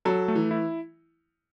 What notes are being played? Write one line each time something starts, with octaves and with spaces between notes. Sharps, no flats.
F#3 A4
A3
E3
E4